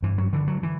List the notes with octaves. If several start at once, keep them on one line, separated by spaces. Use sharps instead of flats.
G2 E3
F#3
D3 E3
F#3
E3